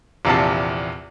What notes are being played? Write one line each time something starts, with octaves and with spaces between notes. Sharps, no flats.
A#1 E2 C3 A5